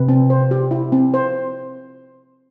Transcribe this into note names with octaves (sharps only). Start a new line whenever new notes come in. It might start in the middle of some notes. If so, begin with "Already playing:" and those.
Already playing: C3 B4
C4
C5
G4
E4
C4
C5